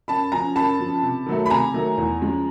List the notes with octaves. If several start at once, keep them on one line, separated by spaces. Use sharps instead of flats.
F#2 A5 B5
C#3 F3 G#5 A#5
F#2 A5 B5
C#3 F3
C3
D#3 F#3 A3
B5
C3 G#5 A#5
D#3 F#3 A3
E2
C#3 F3 G#3